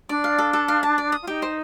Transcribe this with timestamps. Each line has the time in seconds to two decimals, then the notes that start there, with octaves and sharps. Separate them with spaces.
0.09 D4 D5
0.24 F5
0.38 A4
0.53 A4
0.68 F5
0.83 A5
0.98 D5
1.12 D#6
1.22 F4
1.27 D#4 G4
1.42 C5